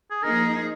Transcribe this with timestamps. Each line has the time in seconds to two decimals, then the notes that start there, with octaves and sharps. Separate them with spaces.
0.11 G#4
0.23 F3 A#3 D#4 G#4 A#4